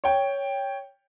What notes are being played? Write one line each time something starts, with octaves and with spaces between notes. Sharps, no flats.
C#5 G5